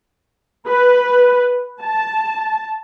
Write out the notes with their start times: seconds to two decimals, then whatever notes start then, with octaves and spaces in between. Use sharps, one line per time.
0.67 B4
1.81 A5